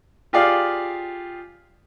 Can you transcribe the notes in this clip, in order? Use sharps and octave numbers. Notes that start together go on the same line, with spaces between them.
F4 G4 G#4 D5 F5